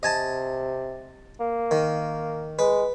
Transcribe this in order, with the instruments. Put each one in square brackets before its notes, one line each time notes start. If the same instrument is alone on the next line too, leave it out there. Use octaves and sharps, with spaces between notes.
[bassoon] C3 [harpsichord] D#5 G#5 A5
[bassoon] A#3
[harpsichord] D#3
[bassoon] G#3 [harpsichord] B4